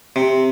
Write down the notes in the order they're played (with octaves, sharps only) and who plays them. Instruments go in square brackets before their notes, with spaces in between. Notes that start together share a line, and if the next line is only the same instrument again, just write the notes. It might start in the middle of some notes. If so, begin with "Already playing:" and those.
[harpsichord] C3